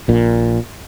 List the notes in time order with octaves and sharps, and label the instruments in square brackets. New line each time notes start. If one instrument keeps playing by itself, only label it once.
[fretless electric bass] A#1 A#2